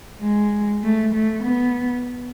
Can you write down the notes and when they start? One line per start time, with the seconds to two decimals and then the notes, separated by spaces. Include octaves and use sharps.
0.22 G#3
0.83 A3
1.14 A3
1.44 B3